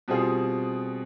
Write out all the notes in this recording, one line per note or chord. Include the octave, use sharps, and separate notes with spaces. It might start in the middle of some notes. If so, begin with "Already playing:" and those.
B2 G3 C4 F4 G#4